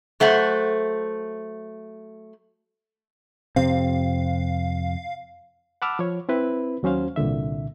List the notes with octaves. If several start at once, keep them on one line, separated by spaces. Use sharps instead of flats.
F#3 A3 C5 F#5
F2 C3 C4 F5
F#5 A5 B5 D6 E6 F6
F3 C#5
C4 E4 B4
D#2 F#3 C#4 C5 F5
C2 A#2 D3 E5